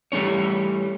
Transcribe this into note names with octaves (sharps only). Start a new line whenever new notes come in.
E3 G3 A3 C#4 C#5